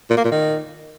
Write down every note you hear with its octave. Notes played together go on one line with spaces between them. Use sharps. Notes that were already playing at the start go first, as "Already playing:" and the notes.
A#2
A#3
A#2
D#3